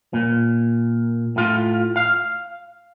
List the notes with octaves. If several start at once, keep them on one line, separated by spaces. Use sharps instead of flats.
A#2
A2 F4
F5